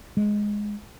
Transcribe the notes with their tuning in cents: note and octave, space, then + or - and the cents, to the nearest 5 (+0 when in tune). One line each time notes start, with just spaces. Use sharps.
G#3 +0